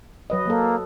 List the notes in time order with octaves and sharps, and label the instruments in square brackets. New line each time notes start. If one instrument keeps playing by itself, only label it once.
[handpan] F#3 B4 D#5
[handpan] F#3 A4 [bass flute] A#3